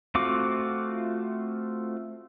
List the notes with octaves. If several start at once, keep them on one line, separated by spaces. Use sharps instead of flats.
A3 C4 F4 F#4 D6